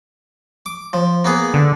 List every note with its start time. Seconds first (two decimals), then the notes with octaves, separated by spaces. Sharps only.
0.66 D6
0.93 F3
1.25 A#3 B3 G#4
1.54 D3